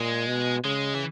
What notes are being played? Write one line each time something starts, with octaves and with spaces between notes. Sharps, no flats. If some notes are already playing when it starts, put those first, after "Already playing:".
Already playing: A#2 G#3
B2
C#3 G#3
E3